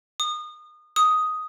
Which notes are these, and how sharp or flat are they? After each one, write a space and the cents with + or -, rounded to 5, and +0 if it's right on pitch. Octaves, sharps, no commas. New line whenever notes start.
D#6 -30
D#6 +5